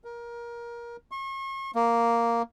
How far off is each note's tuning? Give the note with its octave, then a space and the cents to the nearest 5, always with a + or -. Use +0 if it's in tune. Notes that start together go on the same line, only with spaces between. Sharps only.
A#4 +20
C#6 -40
A#3 +0